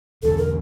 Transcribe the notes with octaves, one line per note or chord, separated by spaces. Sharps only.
E1 E2 D3 A4
A#4